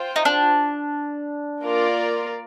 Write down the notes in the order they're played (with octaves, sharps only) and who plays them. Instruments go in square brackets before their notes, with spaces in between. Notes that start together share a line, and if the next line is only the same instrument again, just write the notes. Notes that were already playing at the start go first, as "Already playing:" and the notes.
Already playing: [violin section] F4 C5 G5
[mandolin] D#4
D4
[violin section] A#3 F4 A#4 D5